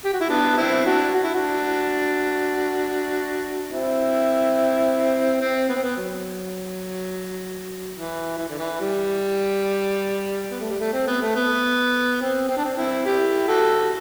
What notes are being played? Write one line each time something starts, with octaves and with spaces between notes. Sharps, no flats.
G4
F#4
E4
B3 D4
C4 E4
D4 F#4
F#4
E4
D4 F#4
C4 E4
C4
B3
C4
B3
F#3
E3
E3
D3
E3
G3
B3
A3
G3
A3
C4
B3
A3
B3
C4
C4
D4
C4
C4 E4
E4 G4
F#4 A4